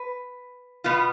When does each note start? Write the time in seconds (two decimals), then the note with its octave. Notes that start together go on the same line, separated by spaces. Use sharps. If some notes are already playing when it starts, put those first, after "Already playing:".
Already playing: B4
0.84 B2 B3 F4